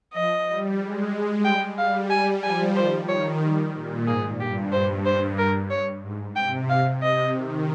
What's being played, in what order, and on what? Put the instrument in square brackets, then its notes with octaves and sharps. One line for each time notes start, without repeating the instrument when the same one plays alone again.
[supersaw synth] F3 [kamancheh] D#5
[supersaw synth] G3
G#3
[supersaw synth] G3 [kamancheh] G5
[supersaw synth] G3 [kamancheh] F5
[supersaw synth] G3 [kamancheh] G#5
[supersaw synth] F3 [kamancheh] G#5
[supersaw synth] D#3 [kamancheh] C5
[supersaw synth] D#3 [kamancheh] C#5
[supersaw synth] G3
A#2
[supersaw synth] G#2 [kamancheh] G#4
[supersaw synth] G2 [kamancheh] G4
[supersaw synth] G2 [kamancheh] C5
[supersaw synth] G2 [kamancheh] C5
[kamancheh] A#4
C#5
[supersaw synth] G#2
[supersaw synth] C3 [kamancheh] G5
[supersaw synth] C3 [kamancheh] F5
[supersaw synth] C3 [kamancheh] D#5
[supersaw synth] D#3